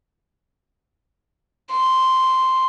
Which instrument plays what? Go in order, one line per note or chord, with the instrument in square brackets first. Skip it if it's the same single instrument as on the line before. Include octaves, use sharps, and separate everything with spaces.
[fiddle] C6